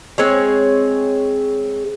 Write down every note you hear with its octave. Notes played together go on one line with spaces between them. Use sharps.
G#3 C4 G#4 C#5